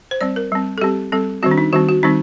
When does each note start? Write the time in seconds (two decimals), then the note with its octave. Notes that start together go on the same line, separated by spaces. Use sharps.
0.11 C5
0.21 G3 C4 D5
0.36 A#4
0.52 G3 C4
0.78 A4
0.81 G3 C4 G4
1.12 G3 C4 A4
1.43 D#3 G3 C4 F#4
1.51 D4
1.58 D#4
1.73 D#3 G3 C4 F#4
1.89 F#4
2.03 D#3 G3 C4 D#4